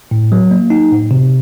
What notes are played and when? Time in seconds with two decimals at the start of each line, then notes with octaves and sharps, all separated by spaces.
0.11 A2
0.32 F#3
0.51 A#3
0.70 D#4
0.91 A2
1.11 C3